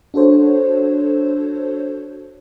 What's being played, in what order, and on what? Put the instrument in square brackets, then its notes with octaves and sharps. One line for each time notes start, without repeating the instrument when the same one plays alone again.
[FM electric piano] D4 F#4 A4 C5 C#5